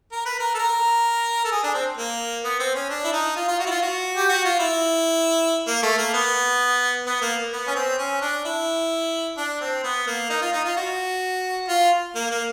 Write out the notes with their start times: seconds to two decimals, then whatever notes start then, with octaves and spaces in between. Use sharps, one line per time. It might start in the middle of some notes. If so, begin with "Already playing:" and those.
0.12 A#4
0.26 B4
0.39 A#4
0.54 A4
0.59 A#4
1.45 A4
1.51 G#4
1.63 D4
1.74 C4
1.97 A#3
2.44 B3
2.60 C4
2.74 C#4
2.90 D4
3.04 E4
3.12 D#4
3.36 F4
3.48 F4
3.60 F#4
3.66 E4
3.71 F4
3.82 F#4
4.17 G4
4.29 F#4
4.45 F4
4.59 E4
5.67 A#3
5.83 A3
5.98 A#3
6.14 B3
7.06 B3
7.21 A#3
7.53 B3
7.67 C#4
7.76 C4
7.98 C#4
8.21 D4
8.45 E4
9.37 D4
9.61 C4
9.84 B3
10.07 A#3
10.30 D#4
10.42 F4
10.53 D#4
10.65 F4
10.77 F#4
11.68 F4
12.15 A#3
12.30 A#3